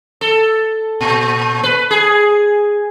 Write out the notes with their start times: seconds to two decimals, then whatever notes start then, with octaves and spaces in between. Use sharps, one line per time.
0.21 A4
1.01 A#2
1.63 B4
1.91 G#4